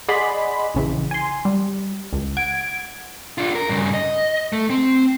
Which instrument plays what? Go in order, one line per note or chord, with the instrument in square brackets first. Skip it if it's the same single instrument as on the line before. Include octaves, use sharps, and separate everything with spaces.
[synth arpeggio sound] G#4 D5 D#5 F#5 B5 C6
A#1 C#3 E3
G#5 C6
G3
C#2
F#5 G#6 D7
[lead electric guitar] D4 F4
A#4
G2 C#3
D#5
A3
C4